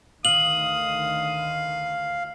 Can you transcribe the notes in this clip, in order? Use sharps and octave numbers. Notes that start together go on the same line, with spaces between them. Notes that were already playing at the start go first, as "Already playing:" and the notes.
D2 D3 D#3 F5 D#6 F#7